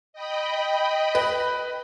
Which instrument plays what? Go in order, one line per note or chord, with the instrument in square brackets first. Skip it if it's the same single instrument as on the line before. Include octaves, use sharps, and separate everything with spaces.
[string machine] D#5 G5 B5
[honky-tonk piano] B4